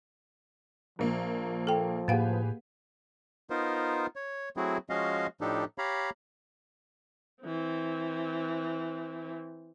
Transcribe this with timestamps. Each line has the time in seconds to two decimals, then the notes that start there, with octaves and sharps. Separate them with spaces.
0.99 A#1 F3 A#3
1.67 A4 G5
2.08 A2 A#3 G4 G#4 B4 F5 F#5
3.50 B3 D#4 F4 A#4 C5
4.16 C#5
4.57 F#3 A3 C4 E4 F#4 G#4
4.90 F3 G#3 C#4 F#4 D#5 F5
5.41 A2 F3 D4 D#4 G4 A4
5.78 G4 C#5 F5 A#5 B5
7.44 E3 C4